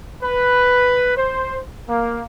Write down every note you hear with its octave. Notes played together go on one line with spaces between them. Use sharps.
B4
C5
A#3